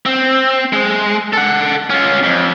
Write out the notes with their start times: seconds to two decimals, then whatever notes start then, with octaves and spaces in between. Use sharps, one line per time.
0.06 C4
0.73 G#3
1.33 A4 F#5
1.90 C#4 F4
2.23 F2